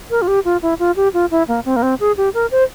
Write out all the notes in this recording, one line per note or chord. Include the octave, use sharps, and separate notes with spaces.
A#4
F4
G4
F4
E4
F4
G4
F4
E4
A#3
C4
A#3
C4
G#4
G4
A#4
C5